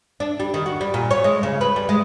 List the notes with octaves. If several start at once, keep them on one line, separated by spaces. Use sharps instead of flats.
D4
G3
D#3
F#4
G3
A#2
C#5
G#3
C#3
B4
G3
G#3